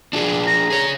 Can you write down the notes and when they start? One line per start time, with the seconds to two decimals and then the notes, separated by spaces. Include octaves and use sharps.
0.13 D4 F4 G#4
0.47 A#5
0.70 G#4 C#5